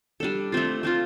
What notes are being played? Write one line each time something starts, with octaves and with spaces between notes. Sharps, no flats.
G3 D4 A4
A3 C4 F4
A3 C4 F4